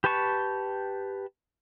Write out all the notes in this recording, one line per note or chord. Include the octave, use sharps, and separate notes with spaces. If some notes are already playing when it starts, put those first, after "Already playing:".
G4 B4 G5 A5 C#6